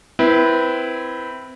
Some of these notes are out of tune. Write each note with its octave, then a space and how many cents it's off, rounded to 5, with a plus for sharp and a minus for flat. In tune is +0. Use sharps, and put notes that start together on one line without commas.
C4 -20 E4 +0 B4 -20